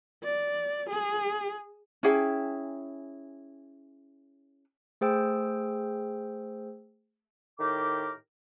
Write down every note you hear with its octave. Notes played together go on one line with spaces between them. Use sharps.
D5
G#4
C#4 E4 G#4 G5
A3 G#4 C5 G5 E6
A2 D#3 G4 A#4 D6